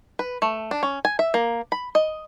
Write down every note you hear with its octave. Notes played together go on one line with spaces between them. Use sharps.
B4
A3
D4
C#4
G#5
E5
A#3
B5
D#5